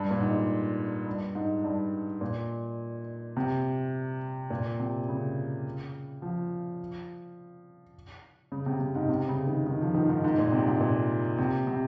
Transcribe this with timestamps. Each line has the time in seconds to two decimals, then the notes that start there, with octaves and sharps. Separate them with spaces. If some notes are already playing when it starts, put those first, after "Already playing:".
Already playing: G2
0.11 A#2
0.21 G#2
1.07 G2
1.35 G#2
1.64 G2
2.21 A#2
3.37 C3
4.50 A#2
4.79 C3
5.09 C#3
6.22 F3
8.52 C#3
8.66 C3
8.80 C3
8.95 G#2
9.09 C3
9.28 C#3
9.47 D#3
9.66 D#3
9.81 F3
9.94 D#3
10.09 G#2
10.24 G#2
10.38 A#2
10.52 C3
10.67 G#2
10.81 A#2
11.38 C3
11.67 C3